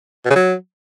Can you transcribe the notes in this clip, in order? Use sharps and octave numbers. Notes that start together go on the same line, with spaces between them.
B2
C#3
F#3